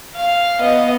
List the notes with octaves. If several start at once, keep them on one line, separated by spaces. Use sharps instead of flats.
F5
B3 D#5